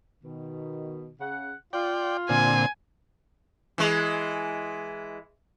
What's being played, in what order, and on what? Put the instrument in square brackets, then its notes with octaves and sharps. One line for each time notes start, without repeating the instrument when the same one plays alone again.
[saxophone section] B2 D#3
C#3 F#5
[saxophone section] F4 [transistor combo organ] D5 G5
[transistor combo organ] A#2 D3 C4 [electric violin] G#5
[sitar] E3 G#3